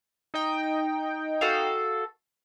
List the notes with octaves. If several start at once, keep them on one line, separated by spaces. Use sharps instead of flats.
D#4 D#5 G5
F#4 A4 F5